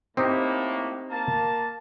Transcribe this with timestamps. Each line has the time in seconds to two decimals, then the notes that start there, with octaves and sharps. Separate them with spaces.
0.17 A2 A#3 C4 D#4 G4
1.10 A#3 A5